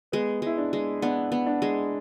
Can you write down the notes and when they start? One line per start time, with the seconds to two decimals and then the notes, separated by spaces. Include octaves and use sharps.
0.12 G#3 B3
0.42 G#3 E4
0.58 D4
0.73 G#3
1.02 B3 D4
1.32 B3
1.46 D4
1.62 G#3